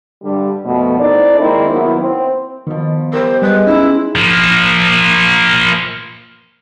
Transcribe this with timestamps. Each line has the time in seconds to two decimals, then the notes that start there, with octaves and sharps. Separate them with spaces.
0.23 G2 D3 G3 G4
0.65 F2 B2 A3
0.99 C4 D#4 E4 A4 D5
1.40 D#3 G#3 A#3 C4 D#4 E4
1.70 D#3 F#3 A#3 B3 E4
2.00 C4
2.67 B2 D#3 F3
3.13 G3 G4 A#4 C5
3.42 G3 G#3 B4
3.67 C#4 D#4 E4
4.16 F3 A#3